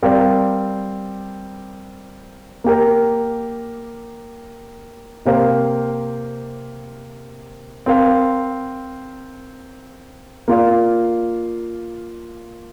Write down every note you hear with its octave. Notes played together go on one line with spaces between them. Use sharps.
G3 C4 A#4 D5 F5
A#3 G4 A#4
C3 A#3 G4 C5 F5
C4 A#4 F5
A#3 F4 D5 F5